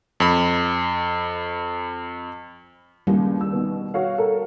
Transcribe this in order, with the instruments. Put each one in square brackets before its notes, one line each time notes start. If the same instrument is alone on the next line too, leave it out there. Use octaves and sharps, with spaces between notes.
[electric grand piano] F2 B5
[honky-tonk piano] D#2 C#3 E3 [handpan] G3
[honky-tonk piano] E6
B2 D#3 B3
F#4 C#5 F5
A4 A#4